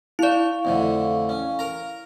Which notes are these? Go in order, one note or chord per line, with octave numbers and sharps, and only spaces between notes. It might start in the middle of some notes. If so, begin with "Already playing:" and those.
E4 D5 F5 C#6
F2 A2 D3
C#4
A#4 A#5